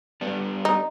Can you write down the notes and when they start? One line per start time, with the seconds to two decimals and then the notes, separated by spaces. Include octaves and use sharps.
0.21 G3 B3 D4
0.65 D#4